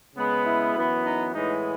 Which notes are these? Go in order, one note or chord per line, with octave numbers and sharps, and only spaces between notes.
C#3 G#3 B3
E4
F#2 E3 B3
D#4
A2 E3 G#3 B3 D#4